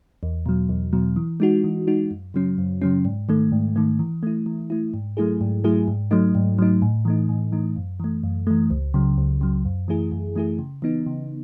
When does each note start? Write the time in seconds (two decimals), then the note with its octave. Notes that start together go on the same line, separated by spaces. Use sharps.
0.23 E2
0.46 B2 F#3
0.69 E2
0.93 B2 F#3
1.16 E3
1.40 G#3 D#4 F#4
1.64 E3
1.87 G#3 D#4 F#4
2.11 F#2
2.34 C#3 F#3 C#4
2.58 F#2
2.82 C#3 F#3 C#4
3.05 G#2
3.29 D#3 A3
3.52 G#2
3.76 D#3 A3
3.99 E3
4.23 A3 E4
4.46 E3
4.70 A3 E4
4.94 G#2
5.17 F#3 A3 E4 G#4
5.41 G#2
5.64 F#3 A3 E4 G#4
5.88 G#2
6.11 F#3 A3 D#4
6.35 G#2
6.59 F#3 A3 D#4
6.82 A2
7.05 E3 A3 D#4
7.29 A2
7.52 E3 A3 D#4
7.76 F#2
8.00 E3 A3
8.23 F#2
8.47 E3 A3
8.70 C#2
8.94 C#3 F#3
9.18 C#2
9.41 C#3 F#3
9.65 F#2
9.88 E3 A3 E4 G#4
10.12 F#2
10.36 E3 A3 E4 G#4
10.59 C#3
10.82 E3 B3 D#4
11.06 C#3